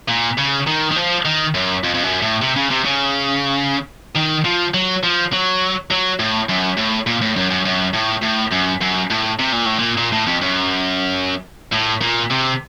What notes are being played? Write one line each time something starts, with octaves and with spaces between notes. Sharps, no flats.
A#2
C#3
D#3
D#3
F3
D#3
F#2
F2
F2
F#2
A2
C3
C#3
C3
C#3
D#3
F3
F#3
F3
F#3
F#3
A2
F#2
A2
A#2
A2
F#2
F#2
F#2
A2
A2
F#2
F#2
A2
C3
A#2
A2
A#2
A#2
A2
F2
F#2
A2
A#2
C3